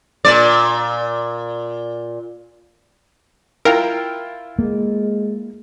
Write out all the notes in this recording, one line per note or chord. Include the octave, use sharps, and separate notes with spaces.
A#2 D5
E4 F4 A#4 G5
G#3 A#3